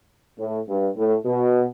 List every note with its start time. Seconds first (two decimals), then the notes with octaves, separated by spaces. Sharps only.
0.39 A2
0.68 G2
0.96 A2
1.25 B2